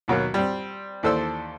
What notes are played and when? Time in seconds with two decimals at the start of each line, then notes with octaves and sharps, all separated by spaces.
0.08 D#2 B2 F#3 A#3
0.34 G3 C4
1.03 D#2 E3 A4 C5 D5 E6